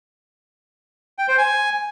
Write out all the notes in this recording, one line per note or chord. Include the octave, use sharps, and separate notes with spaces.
G5
C5
G#5